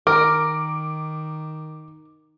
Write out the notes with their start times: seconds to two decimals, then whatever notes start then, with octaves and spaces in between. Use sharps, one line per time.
0.07 D#3 A#4 D6